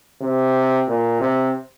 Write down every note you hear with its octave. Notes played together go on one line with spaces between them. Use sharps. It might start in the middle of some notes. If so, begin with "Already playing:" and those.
C3
A#2
C3